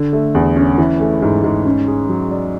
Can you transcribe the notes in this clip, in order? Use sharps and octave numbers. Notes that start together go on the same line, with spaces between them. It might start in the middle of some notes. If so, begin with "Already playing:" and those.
Already playing: D3
A3
E2
C#4
E3
A3
G#2
G#2
C#4
G#4
F#3
D5